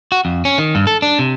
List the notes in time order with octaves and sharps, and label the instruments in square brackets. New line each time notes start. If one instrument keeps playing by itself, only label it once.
[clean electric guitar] F#4
F2
C#4
D#3
G2
A4
D4
C3